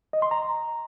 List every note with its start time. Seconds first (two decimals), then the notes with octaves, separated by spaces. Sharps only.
0.13 D#5
0.22 C6
0.31 A#5